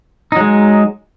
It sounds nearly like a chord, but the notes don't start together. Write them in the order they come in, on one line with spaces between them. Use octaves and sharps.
D#4 F#3 G#3